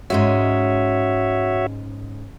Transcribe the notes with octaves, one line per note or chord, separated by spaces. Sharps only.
G#2 G#3 C#4 F#4 C#5 E5